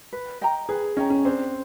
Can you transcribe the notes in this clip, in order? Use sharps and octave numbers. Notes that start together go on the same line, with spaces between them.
B4
D#5 G5 A#5
G#4 B4
C#4 D#5 G5 A#5
C#4
C4 D4